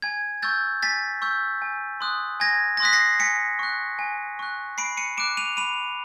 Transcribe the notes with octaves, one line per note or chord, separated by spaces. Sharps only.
G#5 G#6
C#6 E6 G6 A6
G#5 A6 B6
C#6 E6 G6
G#5
C6 D#6 F#6
G#5 G#6 A#6
A#6
C6 D#6 F#6 B6
A#6 C7
G#5 B6 C#7
C#6 F#6
G#5
C#6 F#6
B5 C7 D7
C#7 D#7
D6 F#6 D7 E7
D#7 F7
B5 D#7 F7